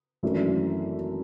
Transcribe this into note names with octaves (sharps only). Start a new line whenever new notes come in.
G#1 F#2 E3 A3 D4